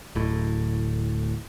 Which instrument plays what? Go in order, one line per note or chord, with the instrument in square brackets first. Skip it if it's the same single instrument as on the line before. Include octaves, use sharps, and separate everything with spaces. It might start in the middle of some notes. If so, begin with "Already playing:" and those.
[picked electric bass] D1 A2